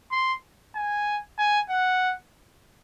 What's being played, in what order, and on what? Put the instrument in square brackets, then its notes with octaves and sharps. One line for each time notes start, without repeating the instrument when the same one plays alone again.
[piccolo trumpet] C6
G#5
G#5
F#5